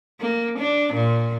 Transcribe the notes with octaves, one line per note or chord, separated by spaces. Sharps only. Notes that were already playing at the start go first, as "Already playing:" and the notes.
A#3
D4
A#2